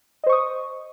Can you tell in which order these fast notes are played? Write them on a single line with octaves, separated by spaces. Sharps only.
D#5 C5 C#6 D#6